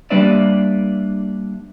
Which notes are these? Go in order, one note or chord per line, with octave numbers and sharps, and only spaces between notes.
G3 A#3 D4 B4 D5 E5